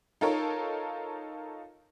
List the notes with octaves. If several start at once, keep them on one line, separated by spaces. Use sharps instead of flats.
D#4 F4 A4 A#4 C#5